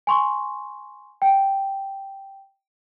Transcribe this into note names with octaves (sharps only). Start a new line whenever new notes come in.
G#5 C6 C#6
G5